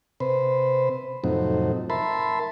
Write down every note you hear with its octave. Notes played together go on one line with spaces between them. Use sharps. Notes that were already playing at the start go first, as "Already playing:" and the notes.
C3 B4 C5
F2 A2 C3 F#3 C4 D#4
A#4 E5 A5 B5 C6